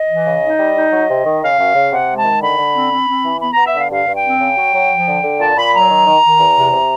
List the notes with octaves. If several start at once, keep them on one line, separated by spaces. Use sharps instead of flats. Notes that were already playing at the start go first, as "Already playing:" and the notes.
Already playing: D#5
E3
C#3
D#4
G3
D#4
F#3
C3
D#3
C#3 F5
F#2
C#3
C3 F#5
G#3
A5
D#3
D3 B5
D3
C4
C4
C4
E3
B3 B5
B3 A#5
E5
D3 F5
G2 F5
G2
G5
C4
C#3
F#3
F#3
F3
D3
D3
A#2 A5
A#2 B5
F#3 A#5
D#3
D#3
D#3
E2
C3
C3